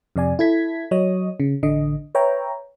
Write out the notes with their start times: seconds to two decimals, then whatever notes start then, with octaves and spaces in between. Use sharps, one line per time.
0.16 F2 C3 D5 G#5
0.39 E4 A4 G#6 B6
0.91 F#3 C#5 D#5 D#6
1.40 C#3
1.63 A1 D3 D#5
2.15 B4 C#5 E5 G5 A#5